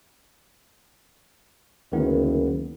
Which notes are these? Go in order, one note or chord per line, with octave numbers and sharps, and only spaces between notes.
F#1 D2 D#3 B3